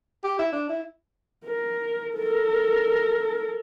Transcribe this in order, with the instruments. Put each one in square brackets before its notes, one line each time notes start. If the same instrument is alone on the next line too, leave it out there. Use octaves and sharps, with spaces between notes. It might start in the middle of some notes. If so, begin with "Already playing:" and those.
[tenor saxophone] G4
E4
D4
E4
[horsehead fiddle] A#4
A4 A#4